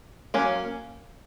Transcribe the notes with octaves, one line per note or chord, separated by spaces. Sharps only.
F#3 A#3 C#4